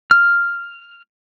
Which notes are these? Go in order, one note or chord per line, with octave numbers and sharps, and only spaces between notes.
F6